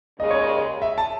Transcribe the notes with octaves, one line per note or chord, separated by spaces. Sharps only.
D#2 C#3 G#3 D#5
C#5
D#5
E5
A5